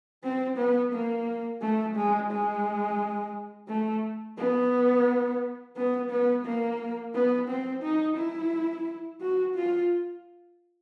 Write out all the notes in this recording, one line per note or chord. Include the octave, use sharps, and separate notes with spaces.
C4
B3
A#3
A3
G#3
G#3
A3
B3
B3
B3
A#3
B3
C4
D#4
E4
F#4
F4